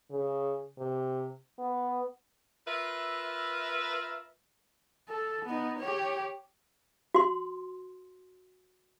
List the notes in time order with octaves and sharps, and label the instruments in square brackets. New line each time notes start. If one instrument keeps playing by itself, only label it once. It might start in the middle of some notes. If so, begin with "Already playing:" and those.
[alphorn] C#3
C3
B3
[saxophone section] F4 A#4 B4 E5
[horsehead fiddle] A4
B3 D#4
G4 C#5
[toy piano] F#4 C6